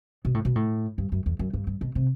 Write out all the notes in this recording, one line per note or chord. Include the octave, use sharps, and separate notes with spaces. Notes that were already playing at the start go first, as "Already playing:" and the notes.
B2
A2
B2
A2
G2
F#2
E2
F#2
G2
G2
B2
C3